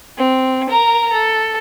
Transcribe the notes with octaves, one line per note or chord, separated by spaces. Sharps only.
C4
A#4 A#5
A4